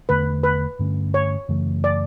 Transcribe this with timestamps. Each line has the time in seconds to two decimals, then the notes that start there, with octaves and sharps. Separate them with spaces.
0.09 E2 D3 A3 B4
0.44 B4
0.79 G2 D3 A3 C#4
1.14 C#5
1.48 F#2 C#3 E3 A3
1.84 D5